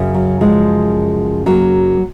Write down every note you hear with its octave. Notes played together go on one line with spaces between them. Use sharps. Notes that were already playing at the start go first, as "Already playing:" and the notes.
Already playing: F#2 C#3
F#3
F3 G#3
F#3 A#3